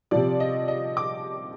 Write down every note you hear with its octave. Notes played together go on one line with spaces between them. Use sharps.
C3 F3 D5
D#5
D#5
D6